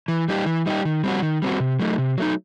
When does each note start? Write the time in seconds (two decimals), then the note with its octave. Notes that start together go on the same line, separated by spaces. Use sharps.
0.08 E3
0.28 G3 D#4 G4
0.46 E3
0.66 G3 D#4 G4
0.85 D#3
1.04 G3 C4 F#4
1.22 D#3
1.42 G3 C4 F#4
1.60 C3
1.80 F#3 A3 D#4
1.98 C3
2.18 F#3 A3 D#4